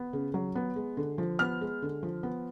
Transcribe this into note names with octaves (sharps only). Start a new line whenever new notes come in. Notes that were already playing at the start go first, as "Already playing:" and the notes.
Already playing: B3
C#3
F#3
B3
G#3
D3
F3
B3 F6
G#3
D3
F3
B3